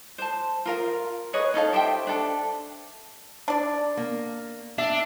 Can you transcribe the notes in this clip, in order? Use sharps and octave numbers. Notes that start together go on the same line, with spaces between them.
C5 A5
F4 A#4 F5
G#4 B4 C#5 D#5
C#4 D#4 A4 F5
G4 C5 E5 G5
D4 A4
D4 D5
A#3
D4 E5